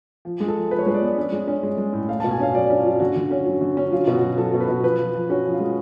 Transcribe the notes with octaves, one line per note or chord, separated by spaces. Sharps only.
F3
G#3
A4
F3
F3 B4
C#5
G#3 B4
D5
B3
C#4
G#3
C#4
G#3
G#3
A2
A3 F5
B2 A5
G#5
C#4 F5
F#3 D5
C#4
F4
F#3
D3 F#4
D3
C#4
F#3
D3
C#4
F#3 F4
B2
F#4
F#3
F#3 A4
B2
B4
B2
F3 B4
F3
F3
C#4 F#4
F3
F4
G#3